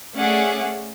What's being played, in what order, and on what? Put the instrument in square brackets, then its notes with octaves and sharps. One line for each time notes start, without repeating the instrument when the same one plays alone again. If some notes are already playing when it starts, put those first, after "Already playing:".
[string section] A3 C#4 G#4 D5 E5 F#5